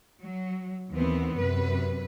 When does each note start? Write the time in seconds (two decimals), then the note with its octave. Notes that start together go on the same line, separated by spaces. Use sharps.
0.20 F#3
0.91 D#2 E3 B3 C4
1.36 F#2 C3 B4